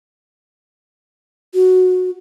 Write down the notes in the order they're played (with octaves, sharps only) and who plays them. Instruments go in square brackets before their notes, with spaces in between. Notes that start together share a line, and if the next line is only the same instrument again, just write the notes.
[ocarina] F#4